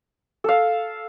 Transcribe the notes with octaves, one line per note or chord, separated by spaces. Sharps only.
A4 F5